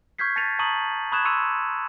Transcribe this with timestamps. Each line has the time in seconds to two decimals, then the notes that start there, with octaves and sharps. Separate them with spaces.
0.18 C#6 F6 G6 G#6 B6 C7
0.36 A5 A6 B6 C#7 D#7 F7
0.59 A5 A#5 C#6 D#6 D#7 F#7
1.12 B5 C#6 D#6 F#6 G#6 E7
1.25 C6 C#6 E6 C#7 D#7 F7